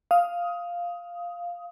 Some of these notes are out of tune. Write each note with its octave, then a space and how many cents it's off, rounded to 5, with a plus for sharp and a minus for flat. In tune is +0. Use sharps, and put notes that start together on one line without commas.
F5 +0 D#6 +15